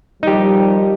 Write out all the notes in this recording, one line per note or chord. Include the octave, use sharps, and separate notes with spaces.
D#3 F3 G3 D#4 G4